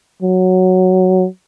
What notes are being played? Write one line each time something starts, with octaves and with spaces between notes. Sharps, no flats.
F#3